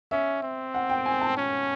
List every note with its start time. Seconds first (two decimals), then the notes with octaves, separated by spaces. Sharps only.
0.11 C#4 E5
0.42 C4
0.74 F#5
0.90 G5
1.06 G#5
1.21 A5
1.37 C#4